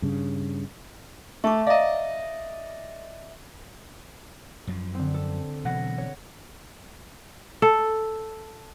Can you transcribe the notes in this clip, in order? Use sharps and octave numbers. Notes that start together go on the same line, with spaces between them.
G2 C#3
A3 E5 C#6 D6
D5 D#5 F5 A#5
F#2 F3
D3 C4
A4
B2 E3 F#3 F#5 A#6
C#5
A4